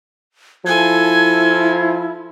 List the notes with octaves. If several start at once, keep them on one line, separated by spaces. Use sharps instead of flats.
F3 E4 A4 G#5 G#6